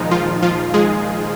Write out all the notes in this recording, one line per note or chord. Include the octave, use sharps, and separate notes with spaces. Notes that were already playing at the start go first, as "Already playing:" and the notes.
Already playing: A#2 D#3 F3 G#3 D#4
F3 F4
F3 F4
G#3 G#4